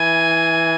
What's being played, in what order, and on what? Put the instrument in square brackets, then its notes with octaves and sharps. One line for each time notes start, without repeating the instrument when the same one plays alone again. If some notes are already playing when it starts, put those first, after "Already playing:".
Already playing: [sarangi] E3 [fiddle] G#5